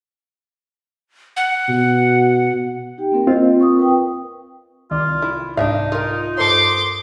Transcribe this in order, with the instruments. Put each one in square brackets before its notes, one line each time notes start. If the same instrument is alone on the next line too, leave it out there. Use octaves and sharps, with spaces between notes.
[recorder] F#5
[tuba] B2
[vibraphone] D#4 G4 G5
A#3 C4 A#4
[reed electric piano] C4 F4 [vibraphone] D#5
[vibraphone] C#6 D#6
A#4 B4 G5
[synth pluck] C2 D#3 D5 [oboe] F4
[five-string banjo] E4
[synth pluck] C2 G#2 [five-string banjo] D4 E5 F5 [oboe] D#4
[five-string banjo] F4 A#4
[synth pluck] G2 A4 C5 [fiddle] C6 D6